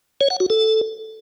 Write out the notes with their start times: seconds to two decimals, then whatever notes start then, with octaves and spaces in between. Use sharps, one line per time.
0.21 C#5
0.30 F#5
0.40 F#4
0.50 A4